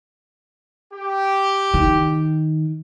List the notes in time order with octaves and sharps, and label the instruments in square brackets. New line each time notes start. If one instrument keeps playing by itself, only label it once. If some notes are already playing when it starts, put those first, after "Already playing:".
[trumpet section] G4
[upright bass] D#3